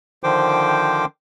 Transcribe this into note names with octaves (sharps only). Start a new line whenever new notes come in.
D3 D#3 F3 C5 G5 D6